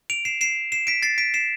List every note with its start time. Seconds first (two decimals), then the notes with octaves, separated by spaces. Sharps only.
0.10 D7 F7
0.25 C7 E7
0.41 C7 E7
0.72 C7 E7
0.87 B6 D7
1.02 A6 C7
1.18 B6 D7
1.34 C7 E7